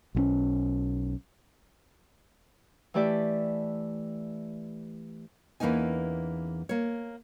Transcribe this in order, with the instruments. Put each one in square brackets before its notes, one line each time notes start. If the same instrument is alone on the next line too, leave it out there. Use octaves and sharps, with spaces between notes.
[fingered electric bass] B1 G3 C#4
[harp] E3 A3 G4 D5 E5
[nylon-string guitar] E2 E3 A#3 C#4 D#4 G#5
A#3 C#5